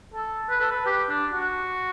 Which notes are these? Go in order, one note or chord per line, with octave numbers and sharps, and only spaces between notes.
A4
B4
A4
B4
G4
D4
F#4